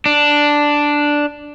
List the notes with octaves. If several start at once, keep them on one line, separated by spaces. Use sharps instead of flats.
D4